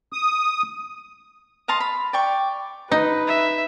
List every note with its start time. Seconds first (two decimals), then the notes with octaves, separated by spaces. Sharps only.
0.13 D#6
1.68 D#5 F5 A5 C6
1.80 B5
2.13 D5 G5 C#6
2.91 D#4 B4
3.27 E5